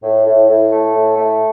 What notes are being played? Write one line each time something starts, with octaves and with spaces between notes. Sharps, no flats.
A2
A2
A2
A3
A2
A3